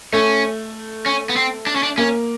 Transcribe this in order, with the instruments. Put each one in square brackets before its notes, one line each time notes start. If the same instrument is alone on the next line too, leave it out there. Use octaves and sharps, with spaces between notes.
[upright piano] A3 [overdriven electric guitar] C#4
[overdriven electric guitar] C#4
B3
C4
D4
C#4
D4
[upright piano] A#3 [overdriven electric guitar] C#4